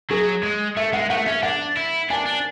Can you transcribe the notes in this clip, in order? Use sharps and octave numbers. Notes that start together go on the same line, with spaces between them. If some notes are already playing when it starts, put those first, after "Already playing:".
F#3 G#4
G#3
A3 E5
G#3 F#5
A3 F#5
C#4 E5
D4 F#5
E4
D4 G#5
D4